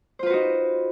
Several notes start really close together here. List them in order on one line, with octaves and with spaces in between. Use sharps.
C5 F4 B4 F#4 D#4